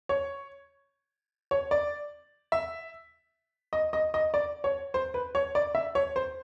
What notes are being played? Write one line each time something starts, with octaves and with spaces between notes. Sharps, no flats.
C#5
C#5
D5
E5
D#5
D#5
D#5
D5
C#5
C5
B4
C#5
D5
E5
C#5
C5